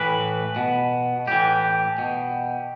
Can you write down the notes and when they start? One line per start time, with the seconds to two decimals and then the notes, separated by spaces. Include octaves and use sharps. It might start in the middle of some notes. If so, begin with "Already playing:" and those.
Already playing: A2 E3 B4
0.56 B2
1.27 A2 E3 G4
1.98 B2